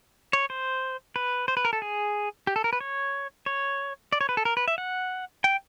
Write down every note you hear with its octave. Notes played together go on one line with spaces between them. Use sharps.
C#5
C5
B4
C5
B4
A#4
A4
G#4
G4
A4
A#4
B4
C#5
C#5
D5
C#5
B4
A4
A#4
B4
E5
F#5
G5